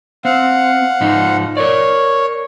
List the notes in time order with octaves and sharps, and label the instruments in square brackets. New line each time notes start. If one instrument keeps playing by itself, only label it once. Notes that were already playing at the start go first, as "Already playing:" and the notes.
[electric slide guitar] C4 [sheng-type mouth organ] F5 F#5
[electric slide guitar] G#2 F3 D#4
[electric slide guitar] A#4 D5 [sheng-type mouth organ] C#5